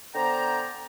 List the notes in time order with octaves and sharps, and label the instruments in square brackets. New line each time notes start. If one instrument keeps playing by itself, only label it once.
[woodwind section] D3 B3 C5 D5 G5 A#5